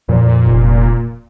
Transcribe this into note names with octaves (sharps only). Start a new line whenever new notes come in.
F2 A#2
F1